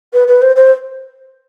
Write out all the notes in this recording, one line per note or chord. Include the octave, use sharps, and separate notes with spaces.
B4
B4
C5
C5